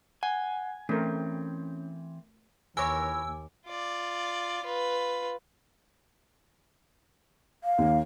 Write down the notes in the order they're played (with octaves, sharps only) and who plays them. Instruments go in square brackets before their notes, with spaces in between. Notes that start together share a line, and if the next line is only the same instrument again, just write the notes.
[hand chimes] F#5 [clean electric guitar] G#5
[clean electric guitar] E3 C4 [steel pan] A3 A#4 [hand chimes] C#4
[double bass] D#2 [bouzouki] E3 A#4 C#5 [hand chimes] G#5 D6 [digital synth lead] E6
[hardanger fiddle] F4 D5
F4 B4
[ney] F5
[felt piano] D#2